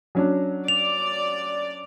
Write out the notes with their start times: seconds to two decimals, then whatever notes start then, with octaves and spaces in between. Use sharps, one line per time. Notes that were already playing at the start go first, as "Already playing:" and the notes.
0.15 F#3 C#4 D4
0.68 D5 F7